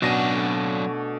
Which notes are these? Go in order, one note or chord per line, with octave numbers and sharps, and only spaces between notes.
B2 F#3 C#4 D4 F#5 D6 A#6 D#7
D3 A3